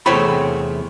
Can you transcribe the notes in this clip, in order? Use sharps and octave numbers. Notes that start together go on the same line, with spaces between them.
E2 C3 A3 C4 C#5 B5